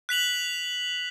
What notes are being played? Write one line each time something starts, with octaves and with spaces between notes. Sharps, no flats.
F#6 B6 F7 F#7